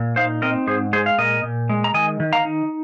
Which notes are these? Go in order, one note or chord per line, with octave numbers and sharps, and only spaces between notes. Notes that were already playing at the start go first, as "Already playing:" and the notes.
Already playing: A#2
D#4 C5 F5
C4 A#4 D#5
G#2 G#4 C5
G#3 G#4 C5
F5
A#2 A#4 D#5
A#2
G#3
A#5
D#3 D#5 G#5
D#3
F5 A#5
D#4